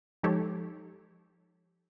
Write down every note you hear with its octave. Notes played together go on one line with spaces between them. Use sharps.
F3 G#3 D#4 G4 A4 C#5